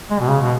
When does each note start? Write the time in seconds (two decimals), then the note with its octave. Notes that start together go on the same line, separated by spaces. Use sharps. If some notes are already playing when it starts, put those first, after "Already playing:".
0.10 G#3
0.20 B2
0.28 C#3
0.41 B2